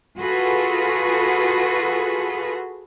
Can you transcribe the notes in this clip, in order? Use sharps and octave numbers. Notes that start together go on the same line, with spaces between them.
F4 F#4 G#4 A4 B4